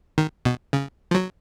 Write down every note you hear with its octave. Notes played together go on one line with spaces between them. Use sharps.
D#3
B2
C#3
F3
F#3